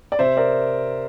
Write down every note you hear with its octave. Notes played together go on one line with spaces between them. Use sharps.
D5
C3 C5 E5
A#4 D5